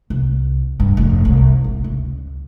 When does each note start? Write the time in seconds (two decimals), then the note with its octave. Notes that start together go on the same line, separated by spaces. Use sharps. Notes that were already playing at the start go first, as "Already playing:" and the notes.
0.10 C2
0.80 G2
0.97 F1
1.25 C2
1.64 G#1
1.84 C#2